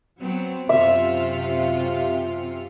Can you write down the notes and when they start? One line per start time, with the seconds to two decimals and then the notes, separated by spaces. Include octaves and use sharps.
0.19 F#3 B3 C4
0.69 F#2 C3 F4 E5